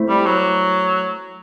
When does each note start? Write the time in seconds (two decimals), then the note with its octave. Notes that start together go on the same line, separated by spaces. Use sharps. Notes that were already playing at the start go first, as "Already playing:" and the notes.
Already playing: A3 C4 E4 C5
0.09 G3
0.26 F#3